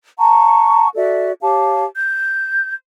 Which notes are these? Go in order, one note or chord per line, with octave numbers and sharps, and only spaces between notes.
F#5 A5 A#5 C#6
F#4 A4 D5 E5
G4 C#5 F5 A5
G6